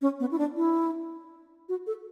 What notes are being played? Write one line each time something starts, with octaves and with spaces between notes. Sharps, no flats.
C#4
B3
E4
D4
E4
F#4
A4